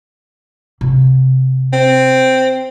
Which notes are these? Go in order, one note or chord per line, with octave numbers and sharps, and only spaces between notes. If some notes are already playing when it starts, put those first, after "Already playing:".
C3 B3
C4